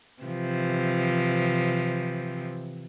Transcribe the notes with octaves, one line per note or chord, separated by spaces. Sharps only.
C3 E3 F3